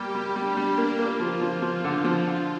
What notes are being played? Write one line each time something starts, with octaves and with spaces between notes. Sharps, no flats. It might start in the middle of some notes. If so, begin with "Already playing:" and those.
Already playing: G3 A#3 G4
G3
G3 D4
G3
A#3
A#3 F4
F3
F3
F3
D3
F3
D3